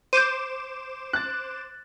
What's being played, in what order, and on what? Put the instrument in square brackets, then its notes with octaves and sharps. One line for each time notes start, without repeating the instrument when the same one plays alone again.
[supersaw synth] C5 D6 E7 [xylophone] G6 D#7
[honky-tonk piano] F#6 A6